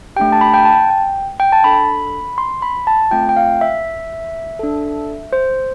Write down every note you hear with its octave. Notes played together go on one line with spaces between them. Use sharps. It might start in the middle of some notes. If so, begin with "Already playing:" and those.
A3 D4 G4 G5
A5
B5
G5
A5
G5
G5
A5
D4 A4 B5
C6
B5
A5
A3 C4 F4 G5
G5
F5
E5
D4 A4
C5